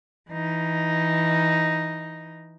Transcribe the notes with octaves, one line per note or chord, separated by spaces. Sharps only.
E3 D#4